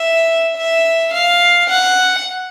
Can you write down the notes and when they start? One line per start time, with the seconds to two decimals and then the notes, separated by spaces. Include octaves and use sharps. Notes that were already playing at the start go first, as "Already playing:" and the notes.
Already playing: E5
0.57 E5
1.13 F5
1.69 F#5